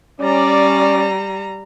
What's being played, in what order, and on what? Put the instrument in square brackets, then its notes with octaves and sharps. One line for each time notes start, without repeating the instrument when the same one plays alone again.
[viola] G3 A#5 [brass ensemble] C#4 D5